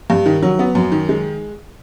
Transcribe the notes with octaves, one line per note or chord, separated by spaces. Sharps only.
G2
D#3
F#3
B3
F#2
D#3
G#3